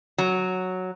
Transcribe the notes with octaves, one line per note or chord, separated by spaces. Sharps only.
F#3